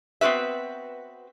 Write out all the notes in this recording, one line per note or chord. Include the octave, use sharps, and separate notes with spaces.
B3 C4 F#4 B4 E5